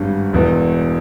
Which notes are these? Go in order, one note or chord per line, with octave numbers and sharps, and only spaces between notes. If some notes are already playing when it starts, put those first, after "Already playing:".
Already playing: G#1 G2 G3 C#4
E1 E2 E3